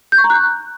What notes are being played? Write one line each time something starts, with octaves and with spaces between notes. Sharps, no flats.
G6
C#6
A#5
F#6